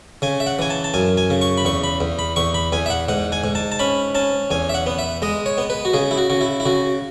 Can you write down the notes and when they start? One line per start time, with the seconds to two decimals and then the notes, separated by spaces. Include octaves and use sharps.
0.22 C#3 G#5
0.40 E5
0.47 F#5
0.59 E3 G#5
0.70 A5
0.84 A5
0.94 F#2 G#5
1.18 G#5
1.30 C#3
1.41 C#6
1.58 B5
1.65 E2 C#6
1.84 B5
2.01 E2
2.19 B5
2.36 E2 C#6
2.54 B5
2.73 E2 G#5
2.86 E5
2.90 F#5
3.09 G#2 F#5
3.32 G#5
3.44 G#2
3.55 A5
3.72 A5
3.79 C#4 B5
4.15 C#4 A5
4.51 E2 G#5
4.69 E5
4.74 F#5
4.87 B3
4.99 E5
5.22 G#3 D#5
5.46 C#5
5.58 B3
5.70 B4
5.85 F#4
5.94 C#3 G#4
6.11 E4
6.18 F#4
6.30 C#3 F#4
6.41 E4
6.60 E4
6.66 C#3 F#4